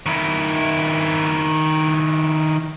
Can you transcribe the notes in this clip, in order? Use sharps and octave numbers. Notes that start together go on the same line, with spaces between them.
D#3 E4